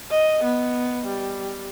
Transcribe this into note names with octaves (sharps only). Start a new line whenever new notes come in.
D#5
B3
G3